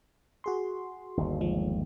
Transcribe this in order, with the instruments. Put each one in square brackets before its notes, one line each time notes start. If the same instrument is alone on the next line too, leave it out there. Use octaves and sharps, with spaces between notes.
[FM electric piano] F#4 G#4 C6
[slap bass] G1 D#2
[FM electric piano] F3 G#3